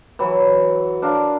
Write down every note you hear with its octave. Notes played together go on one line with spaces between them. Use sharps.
E3 F#3
D4 A#4 F5